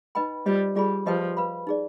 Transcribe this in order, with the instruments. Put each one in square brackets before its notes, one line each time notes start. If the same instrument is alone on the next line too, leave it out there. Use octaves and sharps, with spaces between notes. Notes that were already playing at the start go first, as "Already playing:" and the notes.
[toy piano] D#4 B4 D#5 G5 B5
[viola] G3 [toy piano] F4 C5 D#5
[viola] G3 [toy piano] F4 G#4 D5 G#5 B5
[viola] F3 [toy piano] G4 B4 D#5 G5
[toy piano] B4 F5 B5
D#4 G#4 D5